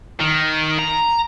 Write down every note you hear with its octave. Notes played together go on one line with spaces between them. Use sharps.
D#3
A#5